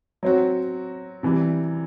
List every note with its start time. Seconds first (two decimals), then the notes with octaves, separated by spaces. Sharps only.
0.23 F#3 C4 F#4
1.23 C3 E3 G3